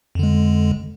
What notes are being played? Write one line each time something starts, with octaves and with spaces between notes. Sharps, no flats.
F2 D3 G#3